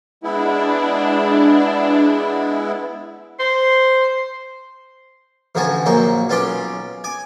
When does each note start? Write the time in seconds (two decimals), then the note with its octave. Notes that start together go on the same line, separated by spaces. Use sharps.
0.23 G#3 B3 D4 E4
3.40 C5
5.55 A1 D3 F3 F#4 G#5 C#6
5.86 A#1 F#3 A#3 C5 C#6
6.29 B1 C#4 F4 B4 C6 D6
7.04 G#5 D6